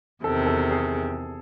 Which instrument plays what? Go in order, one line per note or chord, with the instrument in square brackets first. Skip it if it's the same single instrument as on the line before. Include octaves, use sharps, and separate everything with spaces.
[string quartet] E2 C3 D#3 [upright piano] A4
[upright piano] A4
G#4